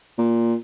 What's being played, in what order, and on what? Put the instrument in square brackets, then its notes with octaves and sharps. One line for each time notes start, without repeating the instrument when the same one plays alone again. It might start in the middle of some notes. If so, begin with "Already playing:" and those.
[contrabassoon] A#2